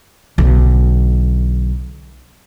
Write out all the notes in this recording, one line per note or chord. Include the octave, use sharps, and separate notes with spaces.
B1 D3